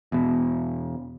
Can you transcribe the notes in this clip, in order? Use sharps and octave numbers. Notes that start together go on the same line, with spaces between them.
E2 B2